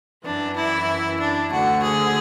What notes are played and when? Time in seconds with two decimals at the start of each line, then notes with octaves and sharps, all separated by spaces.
0.24 F#2 E3 D4
0.56 E4
1.20 D4
1.52 D2 D3 F#4
1.84 G#4